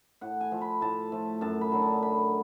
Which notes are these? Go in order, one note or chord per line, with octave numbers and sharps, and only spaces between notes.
A2 F#5
G#5
F3 A3
B5
A2 A5
F3 A3
F#2 A5
B5
D3 F#3
A5
F#2 B5